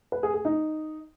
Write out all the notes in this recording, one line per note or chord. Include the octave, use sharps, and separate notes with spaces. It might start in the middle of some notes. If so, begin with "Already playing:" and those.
B4
G#4
G#4
D#4